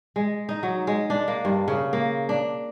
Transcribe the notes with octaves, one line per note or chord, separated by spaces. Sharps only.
G#3
D#4
F#3
G#3
D4
A#3
G2
C#3
A#3
D4